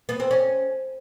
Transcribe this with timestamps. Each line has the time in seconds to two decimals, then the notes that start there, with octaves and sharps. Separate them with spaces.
0.09 B3
0.20 C4
0.31 C#4